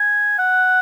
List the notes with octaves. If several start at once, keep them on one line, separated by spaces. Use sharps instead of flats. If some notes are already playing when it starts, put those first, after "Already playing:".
Already playing: G#5
F#5